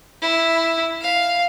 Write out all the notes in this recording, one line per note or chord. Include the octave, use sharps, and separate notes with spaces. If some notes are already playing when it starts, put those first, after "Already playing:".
E4
F5